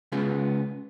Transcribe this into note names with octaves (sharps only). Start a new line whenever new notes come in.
C#3 G#3 B3 C#4 F4